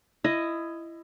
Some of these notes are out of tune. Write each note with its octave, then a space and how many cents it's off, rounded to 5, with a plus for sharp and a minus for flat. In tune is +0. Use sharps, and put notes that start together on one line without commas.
E4 +20 D#5 +0